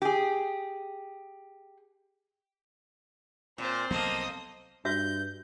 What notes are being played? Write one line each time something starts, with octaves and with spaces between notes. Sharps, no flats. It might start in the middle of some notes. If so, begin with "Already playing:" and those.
G4 G#4
A#2 C4 C5
C2 F#3 A#3 B3 A4 D#5
G2 F#4 E5 G6